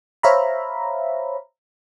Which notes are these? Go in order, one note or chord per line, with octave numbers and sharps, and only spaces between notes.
C5 C#5 E5 F5 A#5 B5